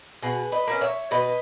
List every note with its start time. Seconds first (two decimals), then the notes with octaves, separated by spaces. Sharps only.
0.22 B2 G#4 B4
0.52 B4 D#5
0.67 A#3 C#4
0.81 C#5 E5
1.11 B2 B4 D#5